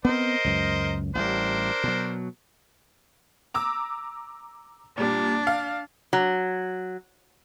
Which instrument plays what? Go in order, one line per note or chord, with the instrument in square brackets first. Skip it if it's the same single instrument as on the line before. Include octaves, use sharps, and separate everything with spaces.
[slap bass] B3 C4 [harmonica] A#4 C5 D#5
[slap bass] C#2 F#2
[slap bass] A1 G3 [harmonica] D4 A#4 C5
[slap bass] B2 F#3
[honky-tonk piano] A#5 D6 E6
[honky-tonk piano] A#2 G3 [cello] D4
[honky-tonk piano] F5
[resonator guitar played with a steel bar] F#3